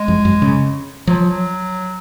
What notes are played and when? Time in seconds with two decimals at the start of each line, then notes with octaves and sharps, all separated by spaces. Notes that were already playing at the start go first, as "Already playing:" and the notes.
Already playing: G#3
0.08 F2
0.25 F#2
0.42 C#3
1.07 F3 F#3
1.28 F#3